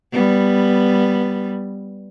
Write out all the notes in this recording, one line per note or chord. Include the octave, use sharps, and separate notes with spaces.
G3 B3